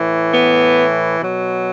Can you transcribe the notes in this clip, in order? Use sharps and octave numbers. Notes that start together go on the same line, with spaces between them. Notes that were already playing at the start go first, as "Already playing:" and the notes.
Already playing: A2 E3
B3
B2 F#3